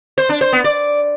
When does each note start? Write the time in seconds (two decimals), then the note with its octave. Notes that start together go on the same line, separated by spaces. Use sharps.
0.18 C5
0.29 D4
0.41 C5
0.53 B3
0.64 D5